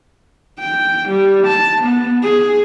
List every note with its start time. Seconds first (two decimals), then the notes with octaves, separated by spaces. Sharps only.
0.59 G5
1.09 G3
1.47 A5
1.83 B3
2.23 G#4